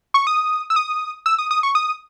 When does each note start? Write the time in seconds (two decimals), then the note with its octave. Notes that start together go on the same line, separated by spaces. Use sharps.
0.14 C#6
0.27 D#6
0.70 E6
0.76 D#6
1.26 E6
1.38 D#6
1.51 D#6
1.63 C#6
1.75 D#6